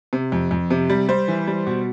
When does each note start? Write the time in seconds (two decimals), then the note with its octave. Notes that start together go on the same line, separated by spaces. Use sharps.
0.13 C3
0.32 F2
0.51 F2
0.71 C3
0.90 G3
1.08 G3 C5
1.28 E3
1.47 G3
1.67 B2